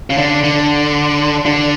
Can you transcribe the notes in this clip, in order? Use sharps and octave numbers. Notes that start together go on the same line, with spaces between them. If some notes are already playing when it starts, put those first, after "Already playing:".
C#3
D3
D3
D3